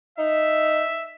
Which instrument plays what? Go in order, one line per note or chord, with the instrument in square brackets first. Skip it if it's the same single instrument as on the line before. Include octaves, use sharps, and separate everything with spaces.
[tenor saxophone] D#4 [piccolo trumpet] E5